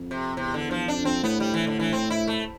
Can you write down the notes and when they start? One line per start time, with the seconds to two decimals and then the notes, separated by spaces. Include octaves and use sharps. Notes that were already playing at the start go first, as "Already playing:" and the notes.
Already playing: F2
0.11 C3
0.37 E2 C3
0.54 D3
0.71 F3
0.88 F2 D4
1.05 F2 C4
1.23 A2 B3
1.40 G3
1.54 E3
1.67 D3
1.79 E3
1.93 C4
2.10 E4
2.27 A3